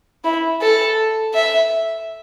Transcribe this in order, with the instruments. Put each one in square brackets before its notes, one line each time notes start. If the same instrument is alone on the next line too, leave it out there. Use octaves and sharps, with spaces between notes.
[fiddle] E4
A4
E5